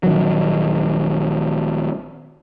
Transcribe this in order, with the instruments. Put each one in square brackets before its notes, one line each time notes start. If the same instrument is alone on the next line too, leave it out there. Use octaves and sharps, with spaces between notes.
[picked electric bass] A#1 D#3 F#3